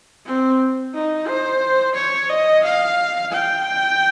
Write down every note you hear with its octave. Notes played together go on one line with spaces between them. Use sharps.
C4
D#4
C5
C#5
D#5
F5
G5